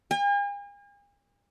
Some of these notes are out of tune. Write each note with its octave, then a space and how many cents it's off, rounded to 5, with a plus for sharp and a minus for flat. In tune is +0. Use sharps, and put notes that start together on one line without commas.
G#5 -45